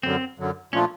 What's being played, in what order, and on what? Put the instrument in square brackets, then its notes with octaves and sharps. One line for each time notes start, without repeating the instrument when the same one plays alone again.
[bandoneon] F#2 D3 F#3 [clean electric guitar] C4
[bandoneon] F#2 D3 F#3
[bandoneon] A#2 F3 A3 D4 F4 [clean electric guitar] C#4